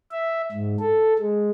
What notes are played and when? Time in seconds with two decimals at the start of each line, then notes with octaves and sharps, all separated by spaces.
0.11 E5
0.52 G#2
0.80 A4
1.19 G#3